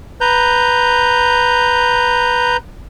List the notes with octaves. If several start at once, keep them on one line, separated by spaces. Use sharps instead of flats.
B4 A#5 G6